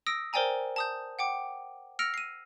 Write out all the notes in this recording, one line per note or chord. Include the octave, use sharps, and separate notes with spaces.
D#6 E6 A#6 D7
A#4 C5 D5 G5 G#5 A#5
A5 D#6 G6
F#5 G5 D6
E6 F6 A#6 C#7 D7 F7
C7 D#7